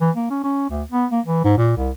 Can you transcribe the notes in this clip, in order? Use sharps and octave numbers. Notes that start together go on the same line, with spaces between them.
E3
A#3
C#4
C#4
D2
B3
A#3
E3
G#2
A#2
C2